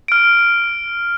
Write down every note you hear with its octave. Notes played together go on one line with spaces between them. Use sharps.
F6 D7